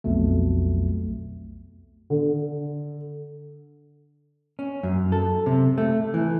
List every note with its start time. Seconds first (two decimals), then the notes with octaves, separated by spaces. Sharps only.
0.04 B1 F2 B2 A3
2.10 D3
4.59 C#4
4.83 F#2
5.12 A4
5.46 C3
5.78 A3
6.14 E3